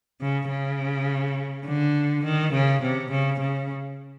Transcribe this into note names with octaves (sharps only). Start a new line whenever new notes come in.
C#3
C#3
D3
D#3
C#3
C3
C#3
C#3